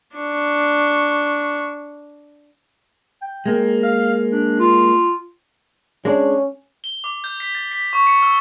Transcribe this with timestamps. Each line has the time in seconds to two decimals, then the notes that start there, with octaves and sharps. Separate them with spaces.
0.16 D4 C#6
3.22 G5
3.46 G#3 A#3
3.83 F5
4.31 D4
4.59 F4
6.05 G#3 C#4 D4
6.84 G7
7.04 D6
7.24 G6
7.40 B6
7.55 A6
7.71 B6
7.93 C#6
8.07 C#7
8.22 E6